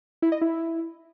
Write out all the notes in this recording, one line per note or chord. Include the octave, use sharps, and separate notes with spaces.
E4
D#5
E4